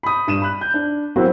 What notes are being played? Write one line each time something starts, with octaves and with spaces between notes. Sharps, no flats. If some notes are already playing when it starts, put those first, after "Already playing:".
B5 D#6
G2 D#7 E7
B5 F#6
G6
D4
F#3 C4 E4 F#4 A#4 E5